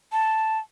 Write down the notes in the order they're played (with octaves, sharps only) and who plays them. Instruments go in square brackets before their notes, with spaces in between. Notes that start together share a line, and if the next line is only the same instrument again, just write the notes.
[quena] A5